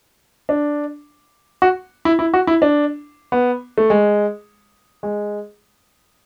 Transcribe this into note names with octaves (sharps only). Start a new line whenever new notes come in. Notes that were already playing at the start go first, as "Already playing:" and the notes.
D4
F#4
E4
E4
F#4
E4
D4
B3
A3
G#3
G#3